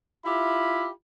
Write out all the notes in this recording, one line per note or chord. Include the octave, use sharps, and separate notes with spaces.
E4 F4 G4 E5 B5